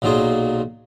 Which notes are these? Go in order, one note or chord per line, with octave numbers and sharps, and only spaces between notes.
B1 A#2 F#3 F4 G#4 C6